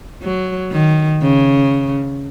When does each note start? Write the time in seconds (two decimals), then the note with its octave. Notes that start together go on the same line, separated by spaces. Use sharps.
0.22 F#3
0.72 D#3
1.22 C#3